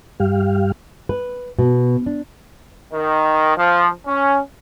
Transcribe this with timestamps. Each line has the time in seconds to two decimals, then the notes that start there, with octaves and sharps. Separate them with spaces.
0.20 G2 G3 G4 F5
1.09 B4
1.59 B2
2.06 D4
2.93 D#3
3.56 F3
4.06 C#4